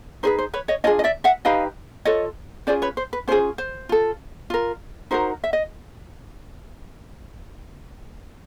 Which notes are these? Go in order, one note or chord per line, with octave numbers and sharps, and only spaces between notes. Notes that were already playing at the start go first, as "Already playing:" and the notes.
D#4 G#4 B4 C5
C5
B4 C#5
C#5 D#5
D4 F4 G#4 C#5 D#5
D#5
D5 E5
E5 F#5
D#4 G4 B4 D#5 F5
F4 A4 C#5 D#5
C#4 F4 G#4 C5 D5
B4 C#5
C5
B4
C#4 F4 G#4 C5
C5
F4 A4
F4 A#4
D#4 F#4 A#4 C5
E5
D#5